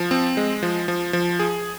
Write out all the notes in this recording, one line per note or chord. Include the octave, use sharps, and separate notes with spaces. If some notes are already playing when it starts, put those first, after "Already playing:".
Already playing: F3
C4
G#3
F3
F3
F3
G#4